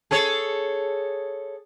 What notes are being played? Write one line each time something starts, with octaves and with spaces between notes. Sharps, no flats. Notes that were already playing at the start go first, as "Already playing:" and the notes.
G#4 A4 C#5